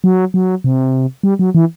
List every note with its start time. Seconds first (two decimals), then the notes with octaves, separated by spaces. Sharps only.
0.04 F#3
0.34 F#3
0.64 C3
1.23 G3
1.39 F#3
1.55 E3